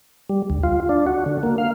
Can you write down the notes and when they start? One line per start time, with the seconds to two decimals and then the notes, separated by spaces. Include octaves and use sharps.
0.29 G3
0.50 D2
0.63 F4
0.89 D4
1.07 F#4
1.26 D3
1.43 A#3
1.58 F5